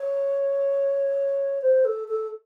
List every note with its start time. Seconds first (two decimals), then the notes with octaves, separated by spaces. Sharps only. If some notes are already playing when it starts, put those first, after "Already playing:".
Already playing: C#5
1.62 C5
1.85 A4
2.08 A4